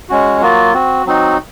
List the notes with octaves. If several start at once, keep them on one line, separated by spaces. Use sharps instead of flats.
G#3 C#4 F#4
F#3 A#3 F4 F#4
C4 F#4
F#3 C4 D#4 F#4